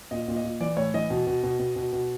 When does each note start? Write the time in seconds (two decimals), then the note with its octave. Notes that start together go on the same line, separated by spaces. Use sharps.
0.11 A#2 D#5
0.28 A#2
0.36 D#5
0.44 A#2
0.60 E3 D5
0.77 A2 C#5
0.94 E3 D#5
1.10 B2
1.27 B2
1.44 B2
1.59 B2
1.76 B2
1.93 B2